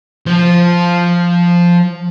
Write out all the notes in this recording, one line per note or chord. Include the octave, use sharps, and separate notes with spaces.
F3 C5